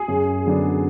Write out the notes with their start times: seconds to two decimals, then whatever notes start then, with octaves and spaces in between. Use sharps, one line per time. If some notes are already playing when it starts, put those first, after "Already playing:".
Already playing: G#4
0.08 F#2
0.46 D3 F#3 B3 D4